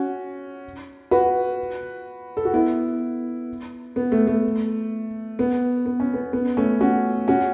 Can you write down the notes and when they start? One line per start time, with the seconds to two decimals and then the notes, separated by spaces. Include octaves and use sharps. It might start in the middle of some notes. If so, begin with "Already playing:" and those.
Already playing: C#4 F#4
1.11 F#4 B4
2.37 A4
2.45 F#4
2.54 B3 E4
3.96 B3
4.12 A3
4.27 A3
5.39 B3
5.86 B3
6.00 C#4
6.14 B3
6.33 B3
6.57 A3 C#4
6.81 C#4 F#4
7.28 C#4 F#4